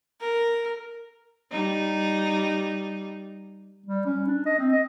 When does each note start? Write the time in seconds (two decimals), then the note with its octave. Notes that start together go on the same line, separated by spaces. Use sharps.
0.20 A#4
1.51 G3 D#4
3.86 G3
4.06 C#4
4.27 D4
4.46 D#5
4.58 C4
4.72 D#5